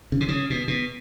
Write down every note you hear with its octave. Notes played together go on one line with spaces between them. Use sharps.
C#3
C3
C#3
B2
B2